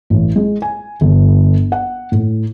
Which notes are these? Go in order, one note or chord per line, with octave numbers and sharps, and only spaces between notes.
A1
G#3
G#5
G1
F#5
A2